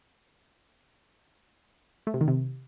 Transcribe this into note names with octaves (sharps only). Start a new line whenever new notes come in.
A3
C3
D#3
C3